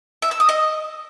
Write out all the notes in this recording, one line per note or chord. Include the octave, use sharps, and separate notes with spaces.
E5
E6
D#6
D#5